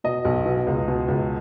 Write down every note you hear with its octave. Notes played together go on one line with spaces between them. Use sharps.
B2 D#5
B1
B2
C#2
B2
C#2